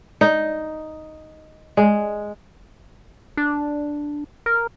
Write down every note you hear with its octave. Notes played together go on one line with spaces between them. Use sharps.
D#4
G#3
D4
A#4